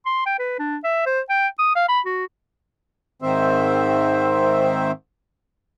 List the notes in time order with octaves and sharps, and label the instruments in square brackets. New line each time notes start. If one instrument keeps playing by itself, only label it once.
[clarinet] C6
G5
B4
D4
E5
C5
G5
D#6
F5
B5
F#4
[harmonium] G#2 D#3 C4 C5 E5